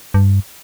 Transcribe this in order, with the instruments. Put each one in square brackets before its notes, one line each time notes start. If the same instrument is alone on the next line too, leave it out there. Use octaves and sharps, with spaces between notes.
[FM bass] G2